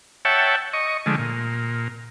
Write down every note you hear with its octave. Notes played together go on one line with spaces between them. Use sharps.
C#5 E5 F#5 G5 A5
D#5 C#6
D3 F3 G#3 A3
A#2